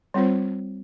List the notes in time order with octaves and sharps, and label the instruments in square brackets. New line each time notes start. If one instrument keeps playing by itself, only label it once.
[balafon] G3 C4 F4 C5